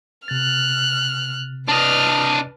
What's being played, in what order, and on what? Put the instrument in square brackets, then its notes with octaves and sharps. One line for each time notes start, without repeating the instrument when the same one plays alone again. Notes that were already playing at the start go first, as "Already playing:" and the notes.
[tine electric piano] C3 A6 [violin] F6 F#6
[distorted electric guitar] D4 D#5 [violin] B4 F6